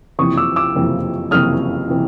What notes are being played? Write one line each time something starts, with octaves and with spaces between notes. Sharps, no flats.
F#1 F2 C3 E3 C#6 D#6
D6 E6
D6 E6
F#1 F2 C3 E3
F#1 F2 C3 E3 D#6 F6
C3 E3